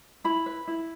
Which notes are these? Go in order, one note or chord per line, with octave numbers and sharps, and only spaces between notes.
E4 B5
B4
E4